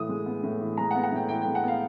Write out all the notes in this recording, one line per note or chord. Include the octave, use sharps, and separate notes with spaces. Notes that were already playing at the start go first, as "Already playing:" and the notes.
Already playing: A2 E3 D#6
G#3
B3
A2
E3
G#3 A#5
F#5
B3
F#5
A2 G5
E3 G5
G#3 G5
F#5
B3 F5